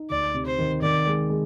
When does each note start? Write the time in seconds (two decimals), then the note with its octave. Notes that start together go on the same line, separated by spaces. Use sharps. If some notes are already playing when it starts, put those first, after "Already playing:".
Already playing: D#4
0.10 D2 D5
0.34 C3
0.46 C5
0.58 D#3
0.82 D#3 D5
1.06 G#3
1.30 G#3